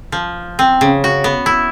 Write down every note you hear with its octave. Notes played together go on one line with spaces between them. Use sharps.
F3
C4
C#3
F#4
B3
E4